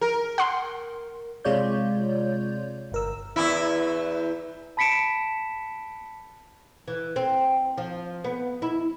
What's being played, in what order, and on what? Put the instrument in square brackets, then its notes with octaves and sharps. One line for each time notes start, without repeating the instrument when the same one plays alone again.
[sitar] A#4
[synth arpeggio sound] F#5 C6
[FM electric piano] C3 G#3 F4 C#5 D5 G6
G1 A#4 E6
[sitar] E2 E4
[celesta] A5 B5 B6 C#7 D7 E7
[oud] E3
C4
F3
B3
E4